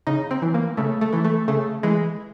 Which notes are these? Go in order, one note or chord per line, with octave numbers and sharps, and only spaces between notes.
C#3 D#4
C4
E3
A#3
C#3 A3
A3
E3
A3
C#3 A3
E3 G#3